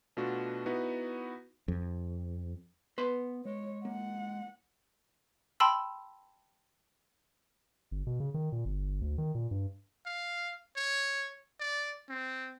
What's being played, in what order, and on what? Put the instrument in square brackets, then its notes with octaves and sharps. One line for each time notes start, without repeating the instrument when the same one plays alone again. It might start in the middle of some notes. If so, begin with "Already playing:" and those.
[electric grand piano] B2 A3 D4 F4 F#4
B3 D#4 E4 F#4 B4
[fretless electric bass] F2
[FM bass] B3 [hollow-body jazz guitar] B4 C6
[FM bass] G#3 [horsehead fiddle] C#5
[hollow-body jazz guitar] A#3 [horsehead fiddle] F#5
[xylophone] G5 A5 B5 C6 E6
[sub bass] G1
B2
C#3
D#3
A#2
G1
D2
D#3
A#2
G2
[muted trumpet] F5
C#5
D5
C4